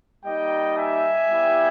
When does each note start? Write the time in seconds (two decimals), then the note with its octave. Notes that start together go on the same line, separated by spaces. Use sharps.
0.24 G3 A#3 D#4 G4 D#5 G5
0.75 E5 G#5
1.28 G3 B3 E4 G4